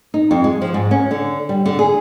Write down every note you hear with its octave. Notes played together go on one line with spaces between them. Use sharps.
D#4
F2
G#3
F3
G#2
C#4
D3
G3
D3
G#4